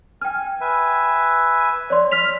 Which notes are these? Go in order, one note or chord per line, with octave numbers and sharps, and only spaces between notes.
G5 G#5 F6
B4 E5 G#5
C#5 D5 C6
F6 B6 F7